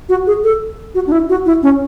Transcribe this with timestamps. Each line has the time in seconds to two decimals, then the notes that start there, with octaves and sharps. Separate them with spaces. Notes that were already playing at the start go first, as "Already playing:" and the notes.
0.09 F#4
0.27 G#4
0.44 A4
0.95 F#4
1.07 D4
1.12 E4
1.29 F#4
1.46 E4
1.63 C#4